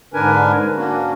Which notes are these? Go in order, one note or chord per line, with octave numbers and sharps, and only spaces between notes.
G#2 D3 D4 A#4 B4 G#5
A#3 C#4 D4 F#4